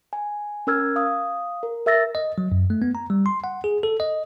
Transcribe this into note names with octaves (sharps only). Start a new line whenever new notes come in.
G#5
C#4 A#4 E6 F6 G#6
F5 D#6
A#4
A#4 E5 E6 A6 A#6
D#5
F#3
F#2
A3
B3
A#5
G3
C6
F#5
G#4
A4
D#5